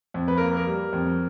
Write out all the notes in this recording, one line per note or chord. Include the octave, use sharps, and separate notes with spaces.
F2
B4
A#3 A#4
A#4
G3
F2